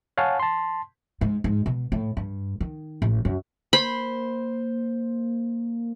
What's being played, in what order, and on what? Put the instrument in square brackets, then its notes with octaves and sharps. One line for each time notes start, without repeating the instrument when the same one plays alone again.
[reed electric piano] C#5 F5 F#5 G#5 A5
A5 C6
[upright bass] G#2
G#2
B2
A2
G2
D#3
A1
F#2
[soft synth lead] A#3 [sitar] C5 [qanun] B5